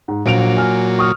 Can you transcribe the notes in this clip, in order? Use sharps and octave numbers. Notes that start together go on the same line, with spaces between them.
G#2
A#1 A#2 F#3 D7 F7
G#5 F6
C#6 D#6 F6